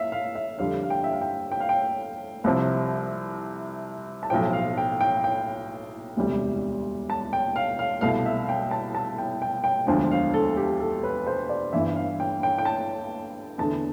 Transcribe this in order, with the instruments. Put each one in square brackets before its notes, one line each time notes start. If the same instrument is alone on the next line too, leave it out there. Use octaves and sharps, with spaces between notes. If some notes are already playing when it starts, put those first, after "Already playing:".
Already playing: [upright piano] E5 F5
F5
E5
F2 D3 G3 F5
F5
G5
E5
F5
G5
G5
F5
G5
C2 C3 F3
A5
B1 A2 F3 G5
F5
G5
G5
G5
E1 D2 C3 G3
A5
G5
F5
F5
C2 B2 A3 F5
E5
F5
G5
A5
A5
G5
G5
G5
E1 D2 D3 F3 G5
F5
A4
G4
A4
B4
C5
D5
G1 G2 E3 E5
F5
G5
G5
G5
A5
E2 D3 A3 A5